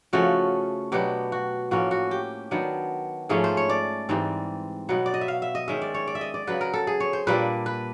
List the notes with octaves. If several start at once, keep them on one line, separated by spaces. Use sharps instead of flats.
C#3 F3 A3 C#4 F#4
B2 F#3 B3 D4 G4
F#4
A2 F3 A#3 C#4 F#4
F#4
G4
D#3 F#3 B3 D4
G#2 F3 A3 C#4 G#4
C5
C#5
D5
G#2 E3 G3 C4
B2 F#3 B3
D5
D#5
E5
F5
E5
D#5
D#3 G#3 C#4 E5
D5
C#5
D5
E5
D#5
D5
C#3 F#3 B3 B4
A#4
A4
G#4
C#5
C5
A#2 G3 A#3 D4 B4
B4